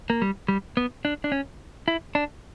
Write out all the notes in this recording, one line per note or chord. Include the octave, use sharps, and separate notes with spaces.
A#3
G3
G3
B3
D4
D4
C#4
E4
D4